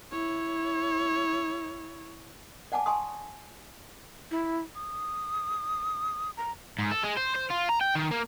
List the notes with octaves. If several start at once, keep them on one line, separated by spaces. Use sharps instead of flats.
E4 C#5
D5 F#5 G#5 A5 D6
G#5 A5 C6 C#6 D#6
E4
D#6
A#5
G#2
A4
G#3
C5
C5
F4
A#5
G5
D#3
A#3